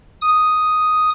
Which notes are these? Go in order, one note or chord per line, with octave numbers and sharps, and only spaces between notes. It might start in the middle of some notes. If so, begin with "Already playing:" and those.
D#6